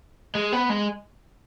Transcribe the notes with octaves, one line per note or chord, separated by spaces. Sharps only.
G#3
B3
G#3